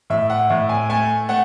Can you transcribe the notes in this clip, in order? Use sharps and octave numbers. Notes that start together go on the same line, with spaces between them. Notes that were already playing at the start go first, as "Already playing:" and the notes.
A2 E5
F#5
A2 E5
G#5
A3 G#5
A3 F#5